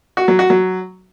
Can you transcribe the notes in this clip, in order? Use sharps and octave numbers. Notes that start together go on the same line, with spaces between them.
F#4
F#3
F#4
F#3